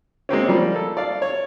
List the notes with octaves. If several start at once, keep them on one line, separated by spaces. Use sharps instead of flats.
G#3 A#3 C4 C#4
F3 G3 A#3
A4
D5 F5
C#5